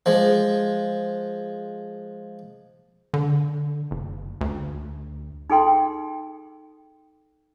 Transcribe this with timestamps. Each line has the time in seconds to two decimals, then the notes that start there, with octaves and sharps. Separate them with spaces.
0.06 F3 G#3
3.14 D3
3.91 F#1
4.41 D2
5.50 D#4 G#4 A4 G5 C6